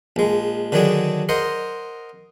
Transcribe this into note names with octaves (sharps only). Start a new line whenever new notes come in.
A#1 G#3
D3 D#3 F#3 D4 G#4
A#4 C5 D#5 F#5